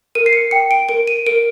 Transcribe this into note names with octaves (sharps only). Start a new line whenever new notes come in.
A#4 D#7
C7
C#7
G5 C#7
D7
A#4 D7
D#7
A#4 D7